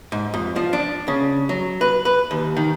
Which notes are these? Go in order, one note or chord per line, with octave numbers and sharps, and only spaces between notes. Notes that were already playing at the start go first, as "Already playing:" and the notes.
G#2
F2
F3
D4
C#3
F#3
B4
B4
D#2
D#3